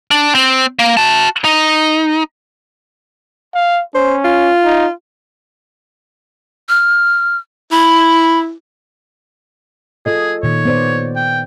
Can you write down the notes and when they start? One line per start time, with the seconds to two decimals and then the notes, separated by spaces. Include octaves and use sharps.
0.11 D4
0.35 C4
0.79 A#3
0.97 F#4 A5
1.44 D#4
3.54 F5
3.95 C#4 C5
4.25 F4
4.64 D#4
6.69 F6
7.72 E4 B5
10.06 F4 G#4 A4 D#5
10.43 A#2 D#3 C#5
10.65 B3 C5 D5
11.16 G5